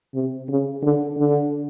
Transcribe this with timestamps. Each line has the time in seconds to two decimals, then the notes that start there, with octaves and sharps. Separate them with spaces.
0.14 C3
0.49 C#3
0.83 D3
1.17 D3